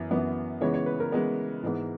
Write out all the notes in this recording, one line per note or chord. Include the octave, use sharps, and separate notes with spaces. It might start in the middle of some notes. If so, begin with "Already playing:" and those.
Already playing: F#2 E3 B3
F#2 E3 B3
C#3 E3 G#3 B3 C#5
C#5
B4
A#4
C#3 E3 G#3 B3
G#2 E3 G#3 B3